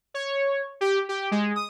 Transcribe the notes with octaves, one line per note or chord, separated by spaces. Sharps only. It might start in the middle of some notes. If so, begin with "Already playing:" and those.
C#5
G4
G4
G#3
D#6